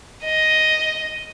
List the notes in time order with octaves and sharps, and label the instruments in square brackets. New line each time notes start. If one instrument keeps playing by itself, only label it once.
[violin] D#5